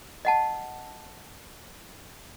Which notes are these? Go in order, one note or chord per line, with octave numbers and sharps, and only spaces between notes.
D#5 F#5 A5